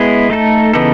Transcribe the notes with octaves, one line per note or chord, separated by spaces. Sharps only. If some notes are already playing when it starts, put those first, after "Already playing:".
Already playing: G#3 B3 E4 G#4
A3 D#4 A4
C#3 E3 B3 D#4 A4